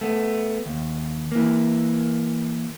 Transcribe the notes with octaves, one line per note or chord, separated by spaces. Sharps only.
A3 B3
D#2
E3 A#3